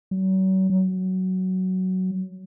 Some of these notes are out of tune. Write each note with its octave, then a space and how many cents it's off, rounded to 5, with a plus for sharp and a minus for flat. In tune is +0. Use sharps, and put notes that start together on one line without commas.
F#3 +40
F#3 +10